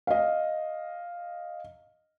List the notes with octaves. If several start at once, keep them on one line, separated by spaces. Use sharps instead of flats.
D#5 F5